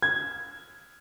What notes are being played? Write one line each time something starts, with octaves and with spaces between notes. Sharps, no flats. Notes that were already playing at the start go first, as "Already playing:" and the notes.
G#6